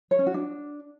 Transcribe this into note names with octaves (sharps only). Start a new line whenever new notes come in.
C#5
C#4
F#4
D4